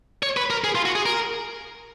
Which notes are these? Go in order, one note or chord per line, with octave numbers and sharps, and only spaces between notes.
C#5
B4
A#4
G#4
F4
F#4
G#4
A#4